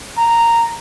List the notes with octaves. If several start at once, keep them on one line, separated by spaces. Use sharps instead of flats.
A#5